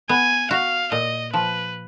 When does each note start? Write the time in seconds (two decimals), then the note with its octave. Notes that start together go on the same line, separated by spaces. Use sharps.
0.09 B3 G#5
0.51 F#4 F5
0.92 A#2 D#5
1.33 F3 B4